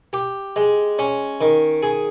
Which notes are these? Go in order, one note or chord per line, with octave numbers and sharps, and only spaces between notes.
G4
G#3
C#4
D#3
G#4